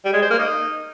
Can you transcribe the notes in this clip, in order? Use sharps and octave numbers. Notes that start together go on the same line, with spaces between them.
G3
G#3
C5
A#3
D#4